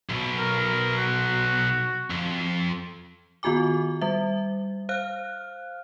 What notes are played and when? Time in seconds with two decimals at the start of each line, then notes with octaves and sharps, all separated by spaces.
0.09 B1 B2
0.38 A#4
0.97 F#4
2.10 F2
3.43 D#3 B3 F4 F#4 G#5 D6
4.01 G3 E5
4.89 C5 F5 F6 F#6